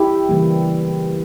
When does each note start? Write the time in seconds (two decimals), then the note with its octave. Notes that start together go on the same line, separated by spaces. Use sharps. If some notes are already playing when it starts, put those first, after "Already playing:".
Already playing: E4 G4
0.29 C#3 E3 G3 A#3